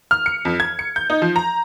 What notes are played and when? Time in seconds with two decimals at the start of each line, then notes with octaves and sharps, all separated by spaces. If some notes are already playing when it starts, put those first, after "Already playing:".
0.11 F6
0.26 C#7
0.45 F2
0.60 G#6
0.79 C#7
0.96 G6
1.10 D#4
1.22 F3
1.36 A#5